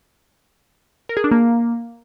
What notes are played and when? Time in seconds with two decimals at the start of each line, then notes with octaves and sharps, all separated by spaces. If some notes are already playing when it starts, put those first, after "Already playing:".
1.09 A#4
1.17 G#4
1.24 D4
1.31 A#3